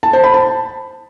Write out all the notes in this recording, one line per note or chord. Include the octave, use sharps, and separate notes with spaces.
A5
C5
B5
A5